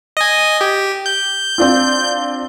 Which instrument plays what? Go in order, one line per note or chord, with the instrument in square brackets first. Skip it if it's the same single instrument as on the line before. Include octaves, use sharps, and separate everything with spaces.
[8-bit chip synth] D#5 G#5
G4
G6
[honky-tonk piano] C4 D4 F4